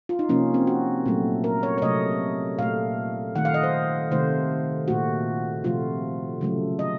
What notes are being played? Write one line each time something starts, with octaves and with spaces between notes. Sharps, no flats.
F4
D#4
C3 F3 A#3 C#4
C4
F#4
A#2 F#3 A3
A#4
C#5
C#5
C3 F#3 A3 D#5
A#2 A3 F5
D#3 A3 F#5
F5
D#5
C5
C3 D#3 A3 C5
A#2 A3 F#4
C3 F3 A3 F4
C#3 F#3 A3
D#5